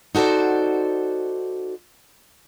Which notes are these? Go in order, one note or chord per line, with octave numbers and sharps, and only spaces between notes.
D#4 F#4 A4 C5 D5